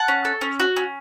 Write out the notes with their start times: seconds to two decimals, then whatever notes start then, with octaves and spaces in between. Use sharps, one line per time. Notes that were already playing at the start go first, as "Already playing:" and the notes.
Already playing: F#5 A5
0.08 C#4
0.25 A4
0.41 C#4
0.60 F#4
0.77 C#4